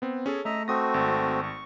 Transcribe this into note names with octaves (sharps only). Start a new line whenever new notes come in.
B3 C4
C#4 G#4 A4
A3 D#5 E5 A#5
A3 C4 F#4 D#6 A#6
G#1
C#6